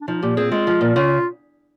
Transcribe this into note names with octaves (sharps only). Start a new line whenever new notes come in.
D4
F3 D#4
A#2 G4
C4 G#4
G#3 F4
F3
A#2
C#3 F4